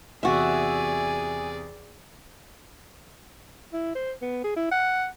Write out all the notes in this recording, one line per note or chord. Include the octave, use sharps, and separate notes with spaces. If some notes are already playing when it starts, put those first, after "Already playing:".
E2 C3 F#4 G#4 D5 E5 G#5
E4
C5
B3
G#4
E4
F#5